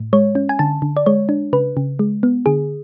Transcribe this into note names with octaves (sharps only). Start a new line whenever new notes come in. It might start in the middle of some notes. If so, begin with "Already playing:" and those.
Already playing: A2
G#3 C#5
C#4
G#5
D3 A5
D3
D5
G#3 C#5
D4
C#3 B4
C#3
G#3
B3
D3 G#4